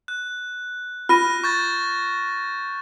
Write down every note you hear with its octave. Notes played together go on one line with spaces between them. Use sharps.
F#6
F4 F6 A#6 D#7
C#6 G6 A6